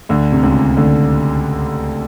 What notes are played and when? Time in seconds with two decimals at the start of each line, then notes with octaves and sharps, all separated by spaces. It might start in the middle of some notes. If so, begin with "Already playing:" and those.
0.09 D2 D3
0.32 C3
0.43 C#2 C#3
0.77 D2 D3